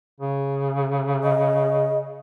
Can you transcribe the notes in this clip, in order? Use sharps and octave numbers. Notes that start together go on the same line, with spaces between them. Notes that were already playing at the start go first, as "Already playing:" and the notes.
C#3
D#5